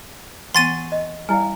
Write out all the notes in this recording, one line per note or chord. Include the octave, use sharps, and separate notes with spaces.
E3 B3 F#5 G#5 C6 C#6 A6 D#7
D#5
G3 E4 D5 F5 G#5